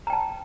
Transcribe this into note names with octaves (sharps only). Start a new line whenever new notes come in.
G5 A5 A#5